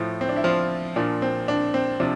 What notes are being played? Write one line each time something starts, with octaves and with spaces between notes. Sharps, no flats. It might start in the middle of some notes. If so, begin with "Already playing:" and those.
Already playing: A2 F3
C4
D4
E4
F3 F4
A#2 F3 D4
C4
D4
C4
C3 F3 D4